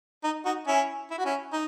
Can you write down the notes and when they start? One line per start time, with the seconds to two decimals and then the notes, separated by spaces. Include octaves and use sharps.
0.24 D#4
0.45 D#4 F#4
0.67 C#4 E4
1.10 E4
1.18 F#4
1.26 C#4 E4
1.53 D#4